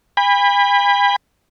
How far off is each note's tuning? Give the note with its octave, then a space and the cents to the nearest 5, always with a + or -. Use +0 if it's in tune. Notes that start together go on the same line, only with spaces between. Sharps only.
G#5 -45 B5 +0